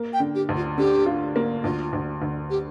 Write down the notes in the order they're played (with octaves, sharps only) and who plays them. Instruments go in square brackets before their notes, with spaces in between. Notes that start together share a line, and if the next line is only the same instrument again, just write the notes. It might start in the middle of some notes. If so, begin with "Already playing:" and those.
Already playing: [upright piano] A#3
[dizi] G5
[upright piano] D3
[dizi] G4
[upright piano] D2
[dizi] F4
[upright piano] D3 [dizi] G4
[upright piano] F4
A#3
[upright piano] D2 [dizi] F4
[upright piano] D2
D2
[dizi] G4